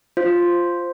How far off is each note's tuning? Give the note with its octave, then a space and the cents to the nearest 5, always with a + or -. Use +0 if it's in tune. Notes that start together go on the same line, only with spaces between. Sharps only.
F4 +0 C5 +0